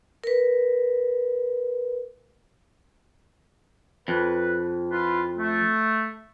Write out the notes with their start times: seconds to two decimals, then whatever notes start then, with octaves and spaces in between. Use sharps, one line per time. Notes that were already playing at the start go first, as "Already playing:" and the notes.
0.24 A#4 B4
4.08 F2 B4
4.91 E4 F4 B4
5.37 A3